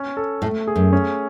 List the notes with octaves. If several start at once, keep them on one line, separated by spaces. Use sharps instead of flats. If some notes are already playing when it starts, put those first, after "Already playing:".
Already playing: C#4
A4
A2 A3
G#4
F#2
C#4